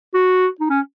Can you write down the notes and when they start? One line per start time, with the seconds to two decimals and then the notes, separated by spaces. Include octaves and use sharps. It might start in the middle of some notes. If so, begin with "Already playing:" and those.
0.14 F#4
0.61 D#4
0.70 C#4